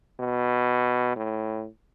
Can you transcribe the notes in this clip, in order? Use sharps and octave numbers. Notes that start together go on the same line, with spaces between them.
B2
A2